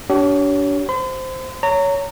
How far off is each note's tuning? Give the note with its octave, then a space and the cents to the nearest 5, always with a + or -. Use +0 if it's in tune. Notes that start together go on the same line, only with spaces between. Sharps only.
D4 -30 G4 -40 C#5 +20
C5 -5 C6 -45
C#5 +20 A#5 -25